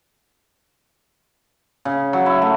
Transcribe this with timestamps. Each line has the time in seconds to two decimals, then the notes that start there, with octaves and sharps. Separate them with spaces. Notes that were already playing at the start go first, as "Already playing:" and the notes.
1.85 C#3
2.13 F#3
2.26 E4
2.42 A3